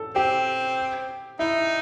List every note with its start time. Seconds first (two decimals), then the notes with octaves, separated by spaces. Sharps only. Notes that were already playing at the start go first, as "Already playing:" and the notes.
Already playing: A4
0.15 C4 G4
1.39 D#4 E4